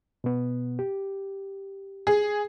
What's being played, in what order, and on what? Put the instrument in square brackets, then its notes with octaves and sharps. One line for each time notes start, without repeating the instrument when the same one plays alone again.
[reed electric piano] B2 B3
G4
[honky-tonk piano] G#4